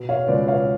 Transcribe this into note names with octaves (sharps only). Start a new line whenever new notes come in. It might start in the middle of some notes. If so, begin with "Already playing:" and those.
Already playing: B2
C#5 F5
C#2 B4 D5
C#5 F5